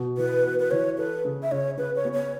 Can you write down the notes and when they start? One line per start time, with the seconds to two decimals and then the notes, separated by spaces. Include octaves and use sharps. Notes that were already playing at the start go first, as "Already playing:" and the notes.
Already playing: B2
0.17 E3 B4
0.45 F#4
0.59 B4
0.71 E3 C#5
0.98 A4 B4
1.25 C#3
1.43 E5
1.52 C#3 C#5
1.78 C#3 B4
1.96 C#5
2.05 B3
2.14 C#5